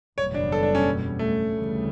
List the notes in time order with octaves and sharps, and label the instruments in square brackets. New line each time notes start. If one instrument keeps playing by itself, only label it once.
[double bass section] F#1 E2 B2 G3 [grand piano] C#5
[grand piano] D4
A4
D4
C#4
A3
[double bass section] D2 C#3 E3 G3